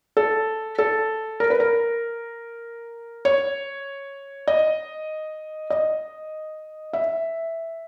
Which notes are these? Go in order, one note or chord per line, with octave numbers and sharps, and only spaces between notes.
A4
A4
A#4
B4
A#4
C#5
D#5
D#5
E5